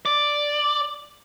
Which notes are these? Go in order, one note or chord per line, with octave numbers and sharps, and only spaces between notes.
D5